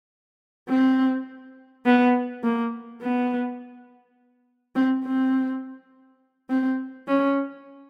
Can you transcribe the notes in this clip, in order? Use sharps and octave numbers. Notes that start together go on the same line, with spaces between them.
C4
B3
A#3
B3
C4
C4
C4
C#4